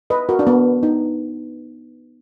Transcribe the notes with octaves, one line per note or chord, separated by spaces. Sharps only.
B4 D#5
F#4 A#4
D4
B3
D#4